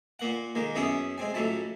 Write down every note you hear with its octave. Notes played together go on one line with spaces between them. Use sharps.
A#2 A#3 F#5
D#3 G#3 A#3
F#2 B3 C#4 E4 G#4 D#6
G#3 C4 G#5
C#2 A2 F#3 E4 A5